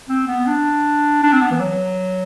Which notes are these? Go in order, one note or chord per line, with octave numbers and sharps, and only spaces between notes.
C4
B3
D4
D4
C4
B3
E3
F#3